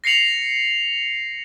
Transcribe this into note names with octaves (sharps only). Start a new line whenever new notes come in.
A#6 C7 C#7 F7 F#7